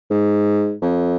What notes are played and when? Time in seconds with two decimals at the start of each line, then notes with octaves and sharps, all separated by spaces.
0.11 G#2
0.82 F2